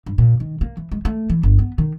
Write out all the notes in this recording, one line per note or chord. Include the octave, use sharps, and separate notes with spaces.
G2
A#2
D#3
A#3
E3
G#3
A3
E3
G1
B3
D#3